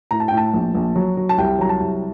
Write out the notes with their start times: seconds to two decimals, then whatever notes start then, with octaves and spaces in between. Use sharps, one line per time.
0.11 A2 A#5
0.20 A5
0.28 G5
0.32 A2
0.37 A5
0.54 A#1
0.75 A#1
0.96 F#3
1.17 F#3
1.29 A5
1.38 C2 G5
1.59 F#3 A#5
1.69 A5
1.80 C2